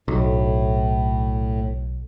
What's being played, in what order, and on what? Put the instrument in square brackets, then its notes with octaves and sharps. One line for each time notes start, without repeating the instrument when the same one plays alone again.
[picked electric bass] B1 [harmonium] A2